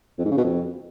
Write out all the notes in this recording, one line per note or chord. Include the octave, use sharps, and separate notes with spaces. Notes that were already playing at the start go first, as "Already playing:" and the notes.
F2
G#2
C#3
B2
F2